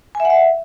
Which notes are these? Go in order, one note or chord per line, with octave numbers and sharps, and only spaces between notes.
G#5
E5
F#5
E5